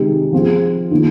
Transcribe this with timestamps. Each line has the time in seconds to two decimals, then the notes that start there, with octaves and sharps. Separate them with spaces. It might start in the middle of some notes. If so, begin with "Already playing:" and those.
Already playing: C3 D#3 G#3 D#4 G4
0.32 F3 C4 F4 G#4
0.91 D#3 A#3 F4